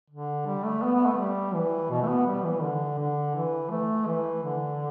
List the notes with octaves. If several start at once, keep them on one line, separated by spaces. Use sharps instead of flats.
D3
G3
A3
B3
B3
A3
G3
E3
B2
A3
B3
G3
E3
D3
D3
E3
A3
E3
D3